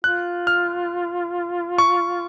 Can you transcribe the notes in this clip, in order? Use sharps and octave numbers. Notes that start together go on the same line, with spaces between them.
F4 F#6
F6
C#6